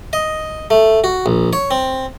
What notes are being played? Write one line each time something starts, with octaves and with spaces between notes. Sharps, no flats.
D#5
A3
F#4
A#1
C#5
C4